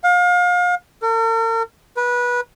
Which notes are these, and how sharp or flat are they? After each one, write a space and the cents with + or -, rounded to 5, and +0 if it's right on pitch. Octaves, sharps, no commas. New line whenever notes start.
F5 +35
A#4 -45
B4 -20